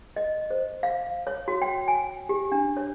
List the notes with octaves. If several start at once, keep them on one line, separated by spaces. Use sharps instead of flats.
D#5
C5
F5
C#5
F#4
G5
G#5
G4
D4
C#5